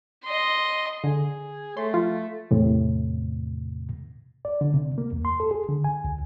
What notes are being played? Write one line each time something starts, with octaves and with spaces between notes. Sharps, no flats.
D#5 C6
D3 G#4
A3 C#5 C6
F3 F4 F5
E2 A2 C3
D5
D3
C3
A#3
E2
C6
A4
G#4
D3
G#5
D2